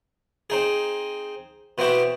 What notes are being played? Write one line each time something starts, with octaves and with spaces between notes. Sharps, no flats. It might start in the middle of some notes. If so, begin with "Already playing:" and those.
C4 D#4 G#4
B2 B3 C4 E4 F#4 G4